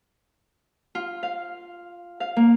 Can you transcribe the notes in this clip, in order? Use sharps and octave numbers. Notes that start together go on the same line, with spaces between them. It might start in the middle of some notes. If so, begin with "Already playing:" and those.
F4
F5
F5
A#3